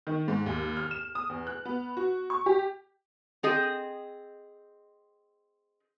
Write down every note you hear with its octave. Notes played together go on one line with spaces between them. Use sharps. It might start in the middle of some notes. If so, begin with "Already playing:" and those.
D#3
G#2
D#2
F6
E7
D#6
E2
F#6
B3
F#4
C#6
G4
C4 G#4 D#5